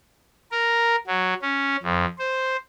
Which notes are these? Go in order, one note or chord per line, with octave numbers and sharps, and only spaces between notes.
A#4
F#3
C#4
F2
C5